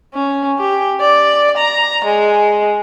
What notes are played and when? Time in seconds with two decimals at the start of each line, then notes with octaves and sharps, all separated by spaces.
0.14 C#4
0.59 G4
1.00 D5
1.58 A#5
2.05 G#3